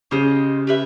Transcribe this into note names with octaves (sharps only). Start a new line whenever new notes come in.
C#3 G4 C5 D#5
G4 B4 E5